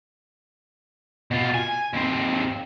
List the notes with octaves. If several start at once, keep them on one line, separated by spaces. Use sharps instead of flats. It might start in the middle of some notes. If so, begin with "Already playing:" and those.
B2 F4
G#5
D#2 C4